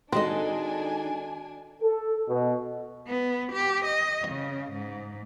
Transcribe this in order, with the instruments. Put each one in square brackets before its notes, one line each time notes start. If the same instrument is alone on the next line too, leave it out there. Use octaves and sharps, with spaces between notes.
[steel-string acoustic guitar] D#3 G#3 A4 [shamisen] C4 [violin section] D4 G#5 [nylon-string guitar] F#4 D#5
[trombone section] A4
B2
[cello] B3
G4
D#5
C#3
G#2